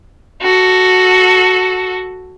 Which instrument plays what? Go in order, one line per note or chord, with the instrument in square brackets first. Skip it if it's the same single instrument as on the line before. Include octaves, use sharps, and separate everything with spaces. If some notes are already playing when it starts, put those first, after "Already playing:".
[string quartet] F#4 A4